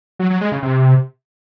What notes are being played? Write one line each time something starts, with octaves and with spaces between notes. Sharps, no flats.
F#3
F#3
G#3
C#3
C3